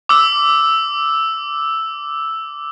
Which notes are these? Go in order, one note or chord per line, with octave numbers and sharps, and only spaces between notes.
D6 E6